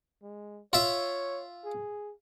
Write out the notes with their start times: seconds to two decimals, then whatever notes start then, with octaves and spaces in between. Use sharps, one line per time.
0.23 G#3
0.73 F4 C#5 E5
1.65 G#4